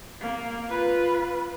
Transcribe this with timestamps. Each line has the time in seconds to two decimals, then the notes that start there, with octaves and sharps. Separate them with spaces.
0.21 A#3
0.69 F4 B4